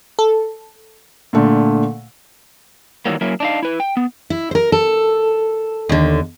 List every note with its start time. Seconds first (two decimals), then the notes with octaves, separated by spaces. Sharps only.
0.19 A4
1.33 A#2 D3 A3
3.06 D#3 E3 F#3 G3 A#3
3.21 F#3 A#3 C#4 E4
3.40 D4 D#4 F5
3.63 E4 B4
3.80 G5
3.97 B3
4.30 E4
4.51 A#4 C5
4.72 A4
5.89 D#2 D3